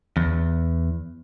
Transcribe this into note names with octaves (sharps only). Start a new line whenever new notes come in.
E2